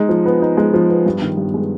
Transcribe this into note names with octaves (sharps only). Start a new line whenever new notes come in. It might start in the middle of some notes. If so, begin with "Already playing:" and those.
Already playing: G#3 D#4
F3
B3
D#4
G#3
F3
B3
G2
D#3
G2
G#3